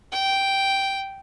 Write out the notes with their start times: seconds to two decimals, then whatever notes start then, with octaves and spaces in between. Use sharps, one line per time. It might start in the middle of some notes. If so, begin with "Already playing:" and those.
0.12 G5